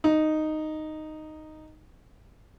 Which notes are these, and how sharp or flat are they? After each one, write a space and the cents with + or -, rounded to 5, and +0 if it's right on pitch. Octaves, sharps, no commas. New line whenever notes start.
D#4 -5